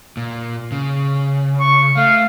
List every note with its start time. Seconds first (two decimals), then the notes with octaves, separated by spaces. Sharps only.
0.17 A#2
0.72 C#3
1.60 C#6
1.97 A3 F5